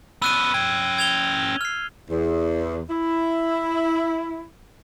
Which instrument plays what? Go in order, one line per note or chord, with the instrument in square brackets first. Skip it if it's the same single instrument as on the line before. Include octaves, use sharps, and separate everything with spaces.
[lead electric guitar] B3 C#4 [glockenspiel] E6 F#6 D#7
[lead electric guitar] C#4 G5 [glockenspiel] G#6
[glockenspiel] G#6 F7 G7
F6 C7
[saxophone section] E2
E4